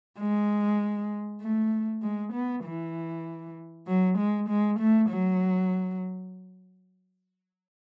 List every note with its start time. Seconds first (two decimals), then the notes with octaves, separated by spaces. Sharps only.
0.19 G#3
1.41 A3
2.03 G#3
2.33 B3
2.64 E3
3.87 F#3
4.18 G#3
4.49 G#3
4.79 A3
5.09 F#3